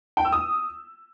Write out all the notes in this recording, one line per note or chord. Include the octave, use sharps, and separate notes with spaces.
G5
E6
D#6